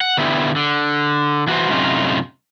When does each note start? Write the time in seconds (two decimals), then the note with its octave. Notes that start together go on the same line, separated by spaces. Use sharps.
0.01 F#5
0.17 D3 B3 E4 G4
0.56 D3
1.47 E3 F#4 G#4 B4 C5
1.69 F#2 A2 C3 C#4 D#4 F4